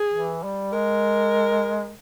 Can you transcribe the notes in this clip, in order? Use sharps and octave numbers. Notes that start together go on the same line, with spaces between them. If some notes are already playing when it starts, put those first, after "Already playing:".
Already playing: G#4
E3
G3
G#3 A#4